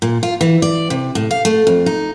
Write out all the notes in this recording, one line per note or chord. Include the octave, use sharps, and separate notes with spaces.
A#2
F4
E3
D5
C3
A2
F5
A3
F2
D#4